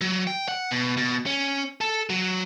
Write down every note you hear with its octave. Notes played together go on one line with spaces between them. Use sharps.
F#3
G5
F#5
B2
B2
C#4
A4
F#3